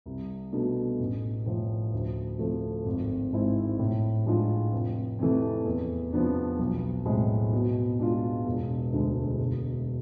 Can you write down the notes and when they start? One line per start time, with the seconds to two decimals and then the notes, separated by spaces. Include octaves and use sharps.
0.06 C2
0.53 B2 A3 D4
0.99 A1
1.46 A2 F3
1.93 D2
2.39 C3 F3 A3
2.86 G#1
3.33 G#2 G#3 C4 E4
3.79 A2
4.26 F3 G#3 D4 F4
4.72 F1
5.19 F2 C3 E3 A3
5.65 E2
6.13 C3 F3 B3 D4
6.59 B1
7.05 A2 G#3 C4
7.52 B2
7.99 G#3 D4 F4
8.46 E1
8.93 D2 D3 G#3
9.39 E1